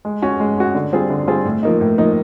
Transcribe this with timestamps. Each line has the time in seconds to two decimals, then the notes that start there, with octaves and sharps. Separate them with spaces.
0.05 G#3
0.22 C#4 F#4
0.40 G#3
0.57 C#4 F#4
0.75 D3
0.93 G3 C4 F4 G#4
1.10 D3
1.27 G3 C4 F4 G#4
1.45 A2
1.63 F3 A#3 D#4
1.81 A2
1.98 F3 A#3 D#4